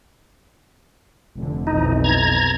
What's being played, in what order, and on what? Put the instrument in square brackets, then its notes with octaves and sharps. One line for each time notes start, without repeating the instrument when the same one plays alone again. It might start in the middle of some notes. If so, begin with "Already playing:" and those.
[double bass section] F1 D3
[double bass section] B1 F2 E3 [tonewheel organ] D#4
[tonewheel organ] A#5 G#6